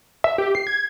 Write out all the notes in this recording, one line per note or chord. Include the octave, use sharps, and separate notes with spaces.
E5
G4
C7
G#6